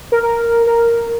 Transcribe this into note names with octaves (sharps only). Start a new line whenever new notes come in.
A#4
A#4
A#4